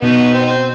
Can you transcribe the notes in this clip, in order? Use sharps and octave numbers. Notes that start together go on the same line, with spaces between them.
B2 B3 D#4
C4
D#4
C4